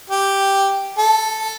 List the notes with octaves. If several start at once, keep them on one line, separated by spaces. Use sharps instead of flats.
G4
A4